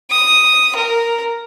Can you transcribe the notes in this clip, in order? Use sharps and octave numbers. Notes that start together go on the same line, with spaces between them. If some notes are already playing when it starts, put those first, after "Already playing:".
D#6
A#4